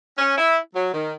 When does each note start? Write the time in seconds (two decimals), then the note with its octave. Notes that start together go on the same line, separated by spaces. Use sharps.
0.18 C#4
0.38 E4
0.75 F#3
0.94 D#3